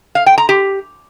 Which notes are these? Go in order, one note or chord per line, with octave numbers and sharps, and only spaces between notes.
F5
G5
A#5
G4